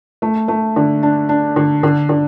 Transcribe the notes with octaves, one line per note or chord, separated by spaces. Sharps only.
A3
A3
D3
D4
D4
D3
D3
D3